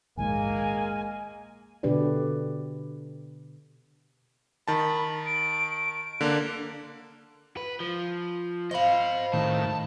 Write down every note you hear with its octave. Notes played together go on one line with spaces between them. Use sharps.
A#1 D#2 G#2 G#3 A#3 G#5
B2 D3 D4 G4 B4 D5
D#3 A5 B5
D7
D7
D3 A#3 D4
B4
F3
C5 D#5 F5 B5
A2 D#3 A5